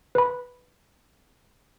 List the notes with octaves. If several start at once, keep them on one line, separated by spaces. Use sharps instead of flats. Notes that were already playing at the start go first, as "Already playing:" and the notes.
B4 B5